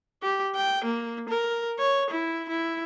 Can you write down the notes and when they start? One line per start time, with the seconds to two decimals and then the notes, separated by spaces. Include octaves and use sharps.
0.23 G4
0.55 G5
0.84 A#3
1.29 A#4
1.79 C#5
2.10 E4
2.48 E4